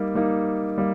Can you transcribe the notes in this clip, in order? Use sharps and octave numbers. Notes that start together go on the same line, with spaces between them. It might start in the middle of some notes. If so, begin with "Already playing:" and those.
Already playing: G3 A#3 D#4
G3 A#3 D#4
G3 A#3